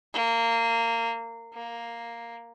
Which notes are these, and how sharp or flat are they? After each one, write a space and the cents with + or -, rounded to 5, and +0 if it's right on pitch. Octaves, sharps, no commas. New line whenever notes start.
A#3 -20
A#3 +0